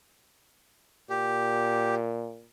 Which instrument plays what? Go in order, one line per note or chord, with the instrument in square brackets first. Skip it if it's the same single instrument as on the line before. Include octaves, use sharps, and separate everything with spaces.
[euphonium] A#2 [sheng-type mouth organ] G4